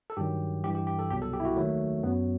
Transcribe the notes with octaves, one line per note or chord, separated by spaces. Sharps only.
A4
G2 D#3 F#3 G4
G2 E3 G4
G4
G4
A4
C2 B2 F#3 G4
A4
G4
E4
F#4
D#2 D#3 F#3 A3
F#2 F#3 B3